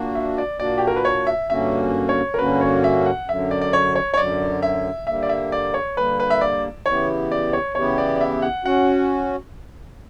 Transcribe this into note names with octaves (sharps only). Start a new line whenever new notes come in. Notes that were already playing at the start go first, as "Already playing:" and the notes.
Already playing: A#2 A#3 D4 F#4
E5
D5
A#2 A#3 D4 F#4 D5
G4
A#4
B4
C#5
E5
G2 D3 A#3 C#4 F#4 E5
C#5
A#4
G2 D3 A#3 C#4 F#4 B4
C#5
E5
F#5
F#2 D3 F#3 E5
D5
D5
C#5
C#5
C#5
F#2 D3 F#3 D5
E5
D3 G3 A#3 E5
D5
E5
D5
C#5
D3 G3 A#3 B4
B4
E5
D5
C#3 E3 B3 E4 G4 C#5
D5
C#5
C#3 E3 B3 E4 G4 C#5
D5
D5
E5
F#5
C#4 F#4 F#5